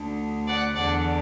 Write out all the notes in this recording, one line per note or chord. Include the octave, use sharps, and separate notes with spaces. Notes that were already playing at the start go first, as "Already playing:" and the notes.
Already playing: D2 D3
D5 F#5
E2 D3 D5 F#5